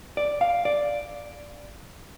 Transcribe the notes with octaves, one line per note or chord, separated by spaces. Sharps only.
D5
F5
D5